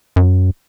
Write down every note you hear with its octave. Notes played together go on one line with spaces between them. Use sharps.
F#2